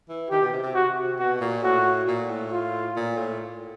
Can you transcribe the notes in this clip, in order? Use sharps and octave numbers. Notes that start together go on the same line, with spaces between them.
E3
D#3 G4
B2
C3
C3
F#4
C3
B2 F#4
A#2
A2 F#4
A#2
A2
F4
A#2
A2